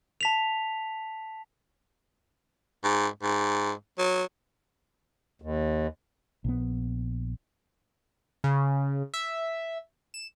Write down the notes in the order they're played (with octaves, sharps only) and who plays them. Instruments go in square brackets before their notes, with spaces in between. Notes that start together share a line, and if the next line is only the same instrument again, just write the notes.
[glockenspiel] A5 B6 F7
[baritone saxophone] G#2
G#2
F#3
[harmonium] D#2
[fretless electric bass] A#1 B3
[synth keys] C#3
E5
E7